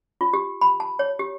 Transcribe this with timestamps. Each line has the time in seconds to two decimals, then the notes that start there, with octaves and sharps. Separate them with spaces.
0.21 F4
0.33 G4
0.61 B5
0.80 A5
0.99 C#5
1.19 G4